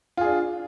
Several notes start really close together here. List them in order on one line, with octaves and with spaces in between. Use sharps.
F4 G#4 D4